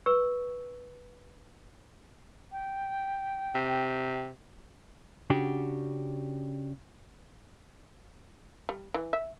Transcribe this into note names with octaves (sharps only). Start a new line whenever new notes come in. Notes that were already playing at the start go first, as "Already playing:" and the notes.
B4 C#6 E6
G5
C3
C#3 D4 F#4 G4
G3
E3
E5